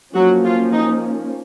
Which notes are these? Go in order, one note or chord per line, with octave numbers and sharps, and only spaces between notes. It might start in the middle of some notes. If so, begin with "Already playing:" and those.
F3 F#3 A#3 C#4 F#4
F4
D#4